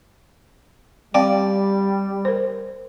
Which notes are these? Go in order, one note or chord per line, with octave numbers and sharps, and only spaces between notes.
G3 C4 D5 F5 G5
A#4 C5